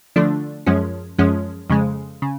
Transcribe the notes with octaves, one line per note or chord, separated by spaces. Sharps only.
D3 F3 A3 D4
F#2 F3 G#3 C#4
F#2 F3 G#3 C#4
F2 C#3 G#3
C#3